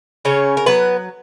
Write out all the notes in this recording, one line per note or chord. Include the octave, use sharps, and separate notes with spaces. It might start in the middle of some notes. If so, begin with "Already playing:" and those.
C#3 C#4 C#5
A#4
F#3 B3 B4